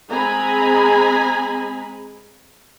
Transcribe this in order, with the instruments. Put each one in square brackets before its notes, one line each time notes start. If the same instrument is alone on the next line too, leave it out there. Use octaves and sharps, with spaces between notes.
[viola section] G#3 C4 G#4 G#5 A#5 B5